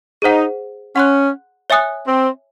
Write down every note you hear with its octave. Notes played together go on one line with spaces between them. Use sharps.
D#4 G#4 C5 F#5
C#4 F#5 C6 F#6
C#5 E5 G#5 D#6 F#6
C4